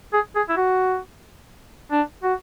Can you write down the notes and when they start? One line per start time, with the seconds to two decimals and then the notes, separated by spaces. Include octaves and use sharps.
0.13 G#4
0.35 G#4
0.49 E4
0.57 F#4
1.92 D4
2.24 F#4